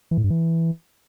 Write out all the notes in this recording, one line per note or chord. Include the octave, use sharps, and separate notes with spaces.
E3
A2
G2
E3